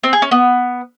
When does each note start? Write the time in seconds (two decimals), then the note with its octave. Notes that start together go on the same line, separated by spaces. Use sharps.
0.03 C4
0.13 G#4
0.22 C#4
0.31 B3